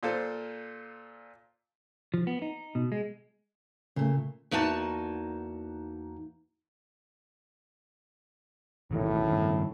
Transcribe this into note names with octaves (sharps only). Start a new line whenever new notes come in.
A#2 F4 A4 C5
F3
B3
D#4
B2
G#3
A#2 C#3 A3
E2 A#3 D#4 F#4 A5
A#1 F#2 A2 D#3 E3
G2 D#3